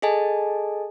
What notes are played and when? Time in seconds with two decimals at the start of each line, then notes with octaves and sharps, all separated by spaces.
0.02 G#4 A4 D#5 G#5 A5